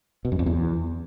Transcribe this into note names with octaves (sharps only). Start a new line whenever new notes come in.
B2
F#2
F2
E2